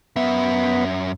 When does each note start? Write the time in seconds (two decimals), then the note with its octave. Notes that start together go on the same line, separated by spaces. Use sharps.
0.16 F#2 B3 E5